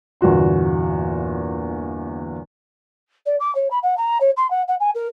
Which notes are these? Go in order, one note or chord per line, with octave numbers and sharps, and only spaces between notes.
G1 E2 A#2 F#4 C6
D5
D6
C#5
B5
F#5
A#5
C#5
C6
F#5
F#5
G#5
A#4